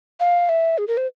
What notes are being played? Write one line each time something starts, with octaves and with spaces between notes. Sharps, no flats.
F5
E5
G#4
A#4
C5